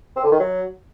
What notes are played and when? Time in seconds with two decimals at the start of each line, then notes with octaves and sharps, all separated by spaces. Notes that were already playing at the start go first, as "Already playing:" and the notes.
0.16 C4
0.24 D3
0.31 D#3
0.39 F#3